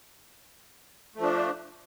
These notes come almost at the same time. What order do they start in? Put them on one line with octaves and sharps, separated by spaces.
A3 F3 D4